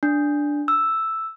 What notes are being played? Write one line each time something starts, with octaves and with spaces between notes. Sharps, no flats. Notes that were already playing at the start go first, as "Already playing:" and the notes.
D4
E6